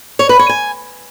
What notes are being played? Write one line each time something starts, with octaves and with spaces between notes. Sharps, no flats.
C#5
B4
C#5
G#5